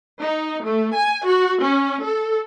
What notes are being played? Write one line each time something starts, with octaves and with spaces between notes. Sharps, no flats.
D#4
A3
G#5
F#4
C#4
A4